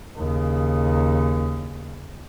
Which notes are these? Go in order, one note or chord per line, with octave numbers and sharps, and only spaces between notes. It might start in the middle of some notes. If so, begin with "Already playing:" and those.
D#2 C#3